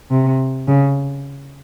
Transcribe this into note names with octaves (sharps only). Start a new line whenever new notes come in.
C3
C#3